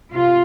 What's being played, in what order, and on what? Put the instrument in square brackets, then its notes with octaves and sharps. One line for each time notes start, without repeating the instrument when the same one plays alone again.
[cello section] C3 F4